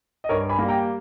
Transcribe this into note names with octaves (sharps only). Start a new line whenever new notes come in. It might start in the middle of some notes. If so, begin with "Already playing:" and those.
D#5
G2 A#4 C#5
G#5 B5
G3 A#3
G5 A#5